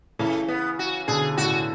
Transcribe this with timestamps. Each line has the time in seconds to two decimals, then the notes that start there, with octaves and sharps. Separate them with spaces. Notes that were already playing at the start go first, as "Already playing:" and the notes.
0.19 C#3 E3 A3
0.48 B3
0.79 F#4
1.08 B2 D3 G#4
1.37 A2 C#3 F#4